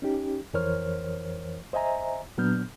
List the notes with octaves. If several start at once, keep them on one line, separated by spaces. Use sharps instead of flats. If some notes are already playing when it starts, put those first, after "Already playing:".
C#4 D#4 G4
F2 E3 A#4 C5 C#5 F6
C5 D#5 E5 G#5 A#5
A#2 F#3 B3 D4 F6 G6